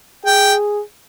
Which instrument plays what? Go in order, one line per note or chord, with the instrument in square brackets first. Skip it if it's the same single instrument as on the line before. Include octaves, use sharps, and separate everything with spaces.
[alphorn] G#4 [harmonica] G5